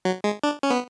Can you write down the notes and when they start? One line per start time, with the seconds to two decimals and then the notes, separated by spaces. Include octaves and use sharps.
0.05 F#3
0.24 G#3
0.44 D4
0.63 C#4
0.70 B3